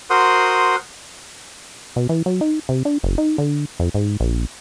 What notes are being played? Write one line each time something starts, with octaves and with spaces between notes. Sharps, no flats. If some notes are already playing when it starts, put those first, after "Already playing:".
F#4 A#4 C5 F#5 C6 D#6
B2
E3
F#3
D#4
C3
D4
F#1
D#4
D3
F2
G#2
A#1